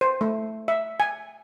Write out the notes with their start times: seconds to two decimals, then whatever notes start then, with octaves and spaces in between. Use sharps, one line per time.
0.01 C5
0.21 A3
0.68 E5
1.00 G#5